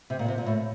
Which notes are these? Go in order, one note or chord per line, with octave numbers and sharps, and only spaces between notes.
C3
A#2
C3
A#2
A2